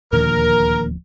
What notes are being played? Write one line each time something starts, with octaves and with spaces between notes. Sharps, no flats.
D1 D#2 A#2 D3 F3 A#4